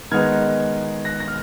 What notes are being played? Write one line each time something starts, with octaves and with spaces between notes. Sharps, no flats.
D#3 G#3 B3 D#4 F6 G#6
F#6 A#6
A#6
F6